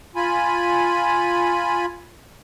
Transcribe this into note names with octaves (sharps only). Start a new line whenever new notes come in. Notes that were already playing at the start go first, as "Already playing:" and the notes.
F4 G#5 B5